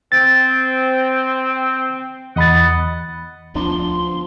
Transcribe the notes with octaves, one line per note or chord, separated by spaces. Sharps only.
C4 A6
E2 D#5 F#5 B5 A6
D2 F3 B3 D4 C6